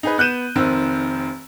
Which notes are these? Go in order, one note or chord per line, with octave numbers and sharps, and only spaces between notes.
D#4 G#4 B4
B3 F#6 G6 D#7 E7
F1 D#3 C4 E6